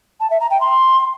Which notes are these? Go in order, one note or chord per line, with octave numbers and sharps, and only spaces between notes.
A5
E5
A#5
G5
C6